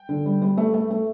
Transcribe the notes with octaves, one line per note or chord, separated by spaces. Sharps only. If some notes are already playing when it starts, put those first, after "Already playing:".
Already playing: G5
D3
G3
G3
A3
A3
A3